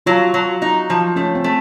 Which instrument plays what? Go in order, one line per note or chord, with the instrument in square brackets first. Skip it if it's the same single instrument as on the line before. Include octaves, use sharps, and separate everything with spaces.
[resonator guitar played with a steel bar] F#3 [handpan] F4
[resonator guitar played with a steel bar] F#3
D#4
F3
[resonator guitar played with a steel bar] A3 [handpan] C#4
[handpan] C4
[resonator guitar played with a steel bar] A3